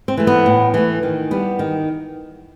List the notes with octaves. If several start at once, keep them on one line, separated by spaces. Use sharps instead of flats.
C4
E3 A3
B3
A2
E3 A3
D#3
G3 B3
D#3